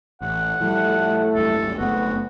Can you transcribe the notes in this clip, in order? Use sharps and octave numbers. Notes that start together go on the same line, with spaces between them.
A1 F#5
A2 F3 G3 A3
F#1 C#2 G2 A4
F#1 A3 B3 F#4